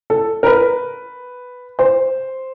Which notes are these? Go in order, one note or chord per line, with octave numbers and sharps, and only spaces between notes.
A4
A#4
B4
C5